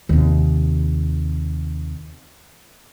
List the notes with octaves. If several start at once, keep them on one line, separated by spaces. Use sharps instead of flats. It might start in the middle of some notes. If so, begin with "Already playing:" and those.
D#2 C3